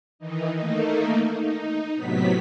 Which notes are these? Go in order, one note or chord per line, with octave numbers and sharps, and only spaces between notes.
D#3 E3 D#4
A3 A#3 D#4
D#4
A2 C3 F#3 B3 B6